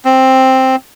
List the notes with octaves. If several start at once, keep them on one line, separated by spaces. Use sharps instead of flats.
C4